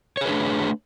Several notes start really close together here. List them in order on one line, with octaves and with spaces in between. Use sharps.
C#5 G#4 B4 D4 A3